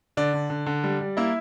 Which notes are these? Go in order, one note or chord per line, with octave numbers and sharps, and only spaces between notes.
D3 D5
D3
D3
D3
G3
G3
A#3 E4 E5